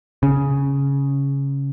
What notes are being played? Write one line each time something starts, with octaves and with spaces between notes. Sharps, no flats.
C#3